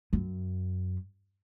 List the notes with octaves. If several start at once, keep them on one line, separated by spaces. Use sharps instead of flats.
F#2